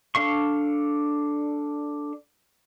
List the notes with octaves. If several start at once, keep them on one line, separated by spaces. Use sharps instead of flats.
D4 A4 F5 C#6